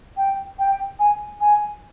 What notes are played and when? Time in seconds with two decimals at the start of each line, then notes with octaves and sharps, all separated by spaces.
0.17 G5
0.59 G5
0.99 G#5
1.41 G#5